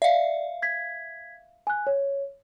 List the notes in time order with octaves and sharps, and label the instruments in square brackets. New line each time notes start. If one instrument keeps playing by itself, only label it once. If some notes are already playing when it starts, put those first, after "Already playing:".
[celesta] D5 [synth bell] E5 F5
[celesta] G#6 B6
G#5 F#6
C#5